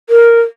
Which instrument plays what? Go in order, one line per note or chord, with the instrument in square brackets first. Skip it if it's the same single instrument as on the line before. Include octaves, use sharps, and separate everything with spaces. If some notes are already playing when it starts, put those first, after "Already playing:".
[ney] A#4